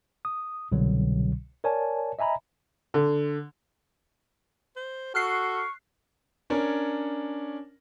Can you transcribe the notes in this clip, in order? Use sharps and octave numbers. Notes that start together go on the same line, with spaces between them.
D#6
C2 B2 D3 F#3
A#4 C#5 D5 G#5 A5
D#5 E5 G#5 A#5 B5
D3
C5
F#4 A4 C#6 F6 F#6 C7
C#4 D4 A#4 C#5